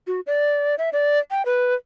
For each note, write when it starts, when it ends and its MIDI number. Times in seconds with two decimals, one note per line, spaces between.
0.07 0.20 66
0.26 0.75 74
0.78 0.89 76
0.93 1.19 74
1.31 1.45 79
1.45 1.74 71